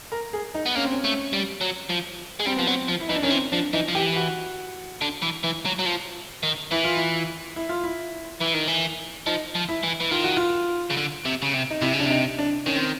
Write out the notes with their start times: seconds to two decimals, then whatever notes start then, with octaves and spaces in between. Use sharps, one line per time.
0.12 A#4
0.33 G#4
0.54 D#4
0.66 B3
0.75 A#3 C#4
0.84 C4
0.93 C#4
1.04 A3
1.33 G3
1.61 F#3
1.89 F3
2.40 G#3
2.46 G3 C4
2.56 F3 B3
2.67 F#3 C4
2.88 F3
3.00 E4
3.09 E3 D#4
3.16 D4
3.23 D#3 C#4
3.30 E3 C4
3.52 F3 D4
3.73 E3 D#4
3.88 F3
3.95 E3 G4
4.16 F#4
5.01 D3
5.22 E3
5.43 E3
5.65 F#3
5.79 F#3
5.86 F3
6.43 D#3
6.71 E3 E4
6.84 F4
6.96 E4
7.56 E4
7.69 F4
7.84 E4
8.41 E3
8.54 D#3
8.68 E3
9.26 F3 D#4
9.55 F3
9.69 E4
9.83 E3
10.00 E3
10.11 D#3 F4
10.24 F#4
10.37 F4
10.90 C#3
10.97 D3
11.25 C3
11.42 C#3
11.54 C3
11.71 D#4
11.81 C3 E4
11.93 C#3
12.00 D4
12.06 C3 D#4
12.39 D4
12.66 D#3 C#4
12.76 C4